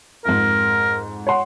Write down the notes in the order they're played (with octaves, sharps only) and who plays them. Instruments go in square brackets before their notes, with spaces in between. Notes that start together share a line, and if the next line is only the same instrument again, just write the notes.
[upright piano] F2 G#2 [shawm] A#4
[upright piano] C#5 F#5 C6